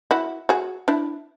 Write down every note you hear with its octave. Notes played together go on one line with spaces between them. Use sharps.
E4 F#4
F#4 G#4
D4 E4